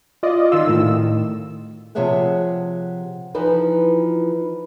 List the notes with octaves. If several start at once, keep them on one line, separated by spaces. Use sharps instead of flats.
F4 D5 D#5
D#3 F4 E6
A2 D#3
C3 F3 G#4 C#5 E5 F#5
E3 F3 D#4 B4